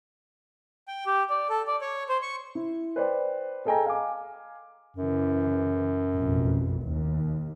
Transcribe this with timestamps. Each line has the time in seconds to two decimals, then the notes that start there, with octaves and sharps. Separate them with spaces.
0.88 G5
1.06 G4
1.30 D5
1.49 A4
1.67 D5
1.81 C#5
2.09 C5
2.22 C#6
2.55 E4
2.96 B4 C5 D5 G5
3.65 G#4 A4 D#5 G5 G#5 A#5
3.86 F5 G#5 D6
4.97 F#2 C#3 E3
6.13 A1 F2 B2
6.83 D#2